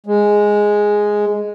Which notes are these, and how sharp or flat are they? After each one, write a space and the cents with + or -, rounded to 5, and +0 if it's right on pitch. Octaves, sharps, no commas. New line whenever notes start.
G#3 +0